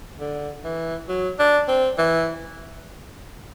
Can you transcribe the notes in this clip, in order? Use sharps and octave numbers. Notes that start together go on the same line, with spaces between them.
D3
E3
F#3
D4
C4
E3